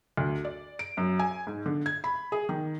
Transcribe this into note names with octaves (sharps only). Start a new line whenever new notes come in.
D2
D5
D7
F#2
G#5
G#2
D3
G#6
B5
G#4
D#3